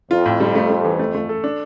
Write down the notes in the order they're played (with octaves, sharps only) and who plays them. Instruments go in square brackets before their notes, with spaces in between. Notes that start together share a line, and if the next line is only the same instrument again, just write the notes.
[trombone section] F2 [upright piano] F4
[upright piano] A2
G3
A3
A3
E3
A3
A3
A4
D4